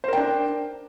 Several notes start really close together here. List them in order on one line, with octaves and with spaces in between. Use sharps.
C5 A#4 G5 D4